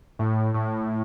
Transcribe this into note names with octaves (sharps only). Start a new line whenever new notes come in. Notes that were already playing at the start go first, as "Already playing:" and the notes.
A2
A2